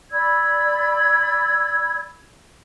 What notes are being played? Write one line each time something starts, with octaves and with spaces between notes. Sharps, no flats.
D5 B5 E6 G#6